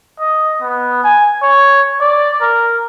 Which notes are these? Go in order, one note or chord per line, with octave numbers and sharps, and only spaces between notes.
D#5
B3
G#5
C#5
D5
A#4